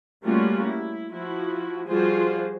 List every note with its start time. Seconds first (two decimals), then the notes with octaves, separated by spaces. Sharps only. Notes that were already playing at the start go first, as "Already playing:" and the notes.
0.23 G3 A3 A#3 C#4 F4 F#4
0.67 E4
1.12 F3 E4 F#4
1.89 F3 G3 F4 F#4 G#4 C5